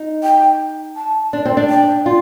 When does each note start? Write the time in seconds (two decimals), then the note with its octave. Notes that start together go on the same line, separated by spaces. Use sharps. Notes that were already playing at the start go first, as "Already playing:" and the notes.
Already playing: D#4
0.23 G5
0.96 A5
1.33 D4
1.45 C4
1.57 D4
1.69 G5
2.06 F4